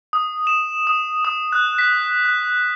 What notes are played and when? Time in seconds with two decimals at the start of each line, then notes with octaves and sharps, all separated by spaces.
0.13 D#6
0.47 E7
0.87 D#6
1.25 D#6
1.52 F#6
1.78 B6
2.25 F#6